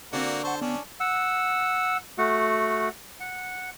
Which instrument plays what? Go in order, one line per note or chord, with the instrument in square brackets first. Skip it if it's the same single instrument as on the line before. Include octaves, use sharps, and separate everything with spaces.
[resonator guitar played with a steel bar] D3 C4 [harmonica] A#3 F#4
[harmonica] C5 A5 [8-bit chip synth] F#5 C#6
[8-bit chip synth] B3 [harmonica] C#4 D4
[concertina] F#5 E6
A3 F#4 F#5
F#5